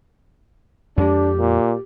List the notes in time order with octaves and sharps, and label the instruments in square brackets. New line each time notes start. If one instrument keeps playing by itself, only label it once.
[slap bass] F2 G#3 [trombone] D4 [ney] G4
[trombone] A#2